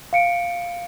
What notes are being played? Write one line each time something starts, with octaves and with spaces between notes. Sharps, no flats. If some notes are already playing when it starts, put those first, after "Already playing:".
F5 C#7 D7